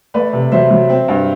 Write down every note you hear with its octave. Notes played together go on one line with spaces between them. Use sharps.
A3 B4 D5
C3
F#3 C5 E5
F#3
C4
G2